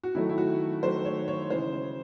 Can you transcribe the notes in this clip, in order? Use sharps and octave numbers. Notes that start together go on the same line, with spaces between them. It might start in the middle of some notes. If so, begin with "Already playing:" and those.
F#4
D#3 F#3 A3 E4
E4
F#4
D#3 F#3 A3 C5
C#5
C#5
C#3 E3 G#3 C5